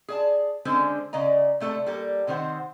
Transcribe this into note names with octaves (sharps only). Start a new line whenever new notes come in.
G#4 D5 A5
D3 G#3 C4 C#4 A4 C5
C#3 D5 D#5 A#5
C3 A3 A4 D5 A5
G3 A#3 A4
C3 D#3 C4 C5 F#5